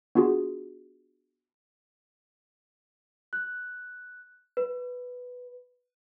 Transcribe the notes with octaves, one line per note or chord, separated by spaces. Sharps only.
B3 D4 F4 F#4 G#4
F#6
B4